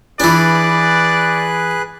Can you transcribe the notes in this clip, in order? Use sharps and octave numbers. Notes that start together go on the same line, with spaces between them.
E3 D4 G#4 B4 D5 F#6